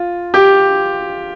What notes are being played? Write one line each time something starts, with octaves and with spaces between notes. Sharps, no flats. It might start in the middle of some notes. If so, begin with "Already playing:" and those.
Already playing: F4
G4